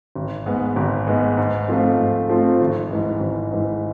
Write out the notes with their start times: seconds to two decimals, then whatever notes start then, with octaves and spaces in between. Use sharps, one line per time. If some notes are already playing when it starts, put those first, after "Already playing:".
0.15 G#1
0.46 G#2 G#3 B3
0.76 G#1
1.07 G#2 G#3 B3
1.37 G#2
1.68 F3 A3 C4 F4
1.99 G#2
2.29 F3 A3 C4 F4
2.61 G#1
2.90 G#2 E3 G#3
3.21 G#1
3.51 G#2 E3 G#3